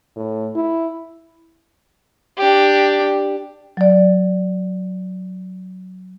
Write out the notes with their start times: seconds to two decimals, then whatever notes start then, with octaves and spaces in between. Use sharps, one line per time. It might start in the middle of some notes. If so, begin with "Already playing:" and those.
0.16 A2
0.55 E4
2.37 D4 G4
3.77 F#3 D5